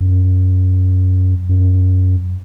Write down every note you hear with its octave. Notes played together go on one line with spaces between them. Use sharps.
F#2
F#2